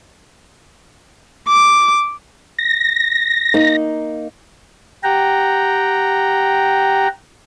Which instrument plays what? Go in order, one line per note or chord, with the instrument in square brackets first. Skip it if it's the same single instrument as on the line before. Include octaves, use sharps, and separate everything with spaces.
[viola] D6
[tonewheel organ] A#6
[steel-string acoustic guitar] A#3 D#4
[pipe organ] G4 F#5 G5 A#5